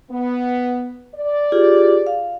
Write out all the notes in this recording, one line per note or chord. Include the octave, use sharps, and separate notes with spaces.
B3
D5
F4 G4 G#4
F5